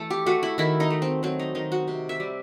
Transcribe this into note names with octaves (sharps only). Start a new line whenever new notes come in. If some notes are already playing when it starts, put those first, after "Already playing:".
Already playing: E3 A3 A4
G4
A3 F#4
E4
D#3 E4
D#4
A3
C4
F#3 C4
D#4
D#3 D#4
F#4
C3
E5
G3